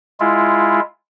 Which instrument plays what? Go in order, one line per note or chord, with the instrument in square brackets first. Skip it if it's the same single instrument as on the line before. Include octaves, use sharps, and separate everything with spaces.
[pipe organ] G#3 E4 F4